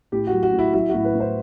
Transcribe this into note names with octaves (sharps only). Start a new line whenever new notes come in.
A2 G4
F#4
F#3
F#4
A2
E4
F#3 E4
A2 F#4
B4
A2
C5